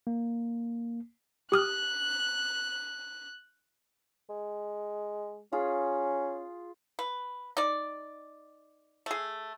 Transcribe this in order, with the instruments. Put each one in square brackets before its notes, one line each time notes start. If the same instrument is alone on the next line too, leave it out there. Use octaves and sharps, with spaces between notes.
[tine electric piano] A#3
[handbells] G4 D#6 F6 [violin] F#6
[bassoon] G#3
[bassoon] C#4 [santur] F4 G#4
[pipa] B4
D#4 D5
A3 G#4